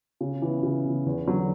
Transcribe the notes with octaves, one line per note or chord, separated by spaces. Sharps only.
C#3
E3 B3
C#3
E3 B3
E2
D3 F#3